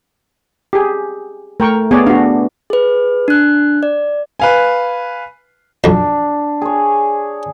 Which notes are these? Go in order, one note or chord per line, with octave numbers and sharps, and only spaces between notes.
G4 G#4
A3 A#4 G5 C#6
B3 G#4 C#5 D5
D4 F#4 F5
G#4 B4
D4 F#6
D5
B4 F5 G#5
B1 F2 D4
G#4 C#5